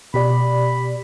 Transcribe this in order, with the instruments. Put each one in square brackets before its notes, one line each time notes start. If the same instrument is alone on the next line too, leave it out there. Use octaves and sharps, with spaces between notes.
[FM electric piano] B2 G4 D5 [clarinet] B5